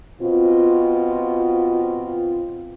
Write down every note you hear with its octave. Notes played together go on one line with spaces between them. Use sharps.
B2 C4 F4